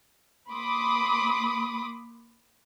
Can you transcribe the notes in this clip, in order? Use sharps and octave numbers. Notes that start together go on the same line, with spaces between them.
A#3 B5 C6 D6 D#6